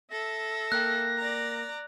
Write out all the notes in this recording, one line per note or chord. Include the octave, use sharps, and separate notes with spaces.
A4 E5 A#6
A#3 A#4 G5 F#6
D5 A#5